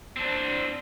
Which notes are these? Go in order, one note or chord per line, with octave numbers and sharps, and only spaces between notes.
C4 D4